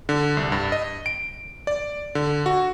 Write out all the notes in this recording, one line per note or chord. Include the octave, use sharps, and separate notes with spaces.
D3
C2
G2
D#5
D7
D5
D3
F#4